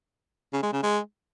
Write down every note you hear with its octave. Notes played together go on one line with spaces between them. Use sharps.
C#3
G#3
C#3
G#3